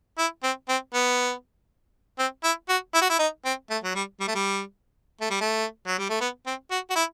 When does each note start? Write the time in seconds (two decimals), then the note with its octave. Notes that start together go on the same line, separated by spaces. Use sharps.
0.18 E4
0.44 C4
0.69 C4
0.94 B3
2.19 C4
2.44 E4
2.69 F#4
2.94 E4
3.02 F#4
3.09 E4
3.19 D#4
3.45 C4
3.70 A3
3.84 F#3
3.95 G3
4.20 G3
4.28 A3
4.35 G3
5.21 A3
5.30 G3
5.41 A3
5.87 F#3
5.98 G3
6.10 A3
6.21 B3
6.46 C4
6.71 F#4
6.90 F#4
6.96 E4